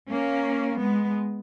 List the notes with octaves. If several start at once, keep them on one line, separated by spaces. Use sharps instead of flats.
A#3 C#4
G#3 B3